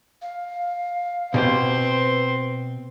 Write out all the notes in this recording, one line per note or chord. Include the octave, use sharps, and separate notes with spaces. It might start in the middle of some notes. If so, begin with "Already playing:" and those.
F5
B2 C4 G4 B4 C5 C6